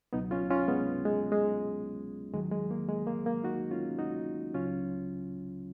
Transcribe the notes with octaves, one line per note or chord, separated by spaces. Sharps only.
C#2 B2 F#3 B3 D#4
C#4 F4
C#4 F4
G#3 B3
G#3
G#3
D#2 D#3 F#3 G#3
G#3
A#3
G#3
A#3
A#3
D#4 F#4
C#4 F4
D#4 F#4
C#2 C#3 F#3 C#4 F4